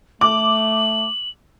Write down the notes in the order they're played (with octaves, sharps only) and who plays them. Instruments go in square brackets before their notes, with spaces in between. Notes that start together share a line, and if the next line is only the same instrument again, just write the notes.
[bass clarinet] A3 [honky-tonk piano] D6 [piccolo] F#7